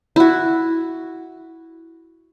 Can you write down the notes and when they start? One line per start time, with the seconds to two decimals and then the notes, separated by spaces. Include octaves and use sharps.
0.16 E4 F#4